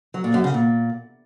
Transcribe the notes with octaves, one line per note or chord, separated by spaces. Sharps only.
F#3
A#2
F#2
C#3
A#2